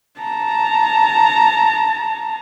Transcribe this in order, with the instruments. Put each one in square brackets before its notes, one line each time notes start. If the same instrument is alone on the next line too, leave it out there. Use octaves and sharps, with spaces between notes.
[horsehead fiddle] A5 A#5